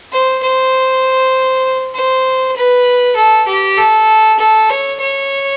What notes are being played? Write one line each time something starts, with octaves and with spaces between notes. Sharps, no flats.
C5
C5
C5
B4
A4
G4
A4
A4
C#5
C#5